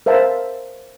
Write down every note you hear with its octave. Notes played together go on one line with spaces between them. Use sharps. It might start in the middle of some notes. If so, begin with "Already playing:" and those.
A#4 C5 E5 F5 A5